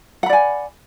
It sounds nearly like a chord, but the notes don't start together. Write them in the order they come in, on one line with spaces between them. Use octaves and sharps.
F#5 B5 D5 G#5